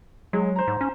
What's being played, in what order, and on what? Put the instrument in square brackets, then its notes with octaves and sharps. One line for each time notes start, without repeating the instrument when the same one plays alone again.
[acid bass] F#3 [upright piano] G#3
[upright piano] C5 A#5
[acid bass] G#2
C#4